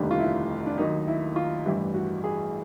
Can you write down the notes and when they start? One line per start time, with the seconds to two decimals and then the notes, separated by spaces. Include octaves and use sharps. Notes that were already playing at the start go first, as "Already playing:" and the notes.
Already playing: F1 D#2 D3 G3
0.11 F4
0.19 E4
0.66 D4
0.78 D#2 D#3 F#3 A#3 D#4
1.07 E4
1.36 F4
1.65 A1 G2 E3 G3 E4
1.94 F#4
2.24 G#4